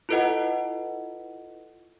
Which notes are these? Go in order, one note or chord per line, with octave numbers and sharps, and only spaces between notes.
E4 F4 A4 B4 D#5 F#5